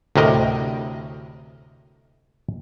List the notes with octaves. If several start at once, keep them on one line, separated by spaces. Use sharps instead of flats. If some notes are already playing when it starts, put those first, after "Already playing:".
D2 A2 C3 A#4 D#5